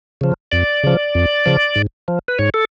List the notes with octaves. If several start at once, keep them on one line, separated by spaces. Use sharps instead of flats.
C#3 F3
F2 D5
C#3 F3
F2
C#3 F3
G#2
F3
B4
G#2 C#5
A4